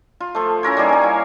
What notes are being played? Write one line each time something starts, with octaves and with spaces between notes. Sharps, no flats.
F4
F3 A3
C#4 E4 A#4 C#5
G3 A#3 D#4 G#4
G#4 G#5
E4 F5